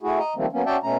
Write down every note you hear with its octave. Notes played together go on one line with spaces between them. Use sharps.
A3 E4 F#4 G#4
D#5 A#5
D#3 F3 G3 A3 A#3 C4
F#3 A#3 B3 C#4
C#4 F#4 D5 E5 G5 A5
B2 A3 C#4 A#5